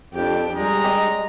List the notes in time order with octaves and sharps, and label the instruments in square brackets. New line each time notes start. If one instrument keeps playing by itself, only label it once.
[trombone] F2 [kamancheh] D4 G4
[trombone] G3 [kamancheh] G#3 [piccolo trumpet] A#5
[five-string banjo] G4 D#5